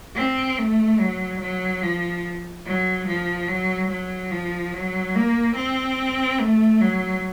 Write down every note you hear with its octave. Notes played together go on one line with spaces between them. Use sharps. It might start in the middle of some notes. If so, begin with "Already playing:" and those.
C4
A3
F#3
F#3
F3
F#3
F3
F#3
F#3
F3
F#3
A#3
C4
A3
F#3